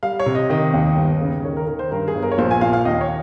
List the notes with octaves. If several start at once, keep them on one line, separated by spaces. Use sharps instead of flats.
G3 F5
C#5
C3
D#5
D#3 D#5
D#2
G1
C#3
D#3 C#5
A#4
D#3 A#4
C5
G2 A#4
G#4
G1
A#4
C#5
A#1 C5
G#5
A#2 F5
F5
D#2 D#5
C#5